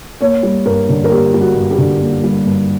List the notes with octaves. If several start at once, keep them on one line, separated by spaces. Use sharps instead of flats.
A#3 C#5
G3
G2 A#4
D3
A#4
A#3 G4
G3
F#4
G2
G4
D3
A#3
G3
G2